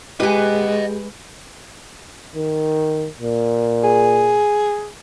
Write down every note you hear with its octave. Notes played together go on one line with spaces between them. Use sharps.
G#3 G4 B4 D#5 F#5 G#5
D#3
A#2
G#4